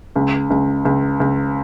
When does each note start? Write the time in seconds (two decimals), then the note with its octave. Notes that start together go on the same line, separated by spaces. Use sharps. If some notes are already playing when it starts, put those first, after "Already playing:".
0.16 C#2
0.50 C#2
0.85 C#2
1.20 C#2